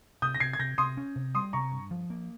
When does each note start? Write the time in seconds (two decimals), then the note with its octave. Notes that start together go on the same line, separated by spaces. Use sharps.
0.22 C3 D#6 G6
0.35 A#6
0.40 C3 G#6 C7
0.53 G#6
0.59 C3 G6 A#6
0.78 C3 C6 D#6
0.97 C#4
1.16 C3
1.35 G3 C6 D#6
1.53 C3 A#5 C#6
1.72 G2
1.91 F3
2.10 A#3